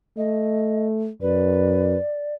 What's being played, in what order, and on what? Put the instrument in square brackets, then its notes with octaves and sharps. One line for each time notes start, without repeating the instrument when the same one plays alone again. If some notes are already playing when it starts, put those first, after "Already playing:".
[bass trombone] A3 [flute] D#5
[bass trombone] F#2 [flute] B4 [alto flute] D5